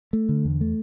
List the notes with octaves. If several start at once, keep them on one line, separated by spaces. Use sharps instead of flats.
A3
D3
E2
A3